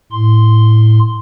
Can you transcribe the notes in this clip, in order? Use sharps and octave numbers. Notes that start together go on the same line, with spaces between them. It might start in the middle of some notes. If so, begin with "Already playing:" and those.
A2 C6